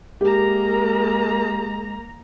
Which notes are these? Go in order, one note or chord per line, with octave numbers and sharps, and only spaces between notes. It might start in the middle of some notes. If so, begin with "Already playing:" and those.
G#3 A#3 G4 A#4 A#5